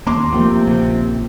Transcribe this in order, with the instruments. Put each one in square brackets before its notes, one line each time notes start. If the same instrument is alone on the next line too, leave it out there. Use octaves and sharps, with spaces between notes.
[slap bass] D#2 A#3 [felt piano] A#5 C6 D6
[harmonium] C3 C4 [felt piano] F3 A#3 [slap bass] A3
[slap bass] A#1 C#3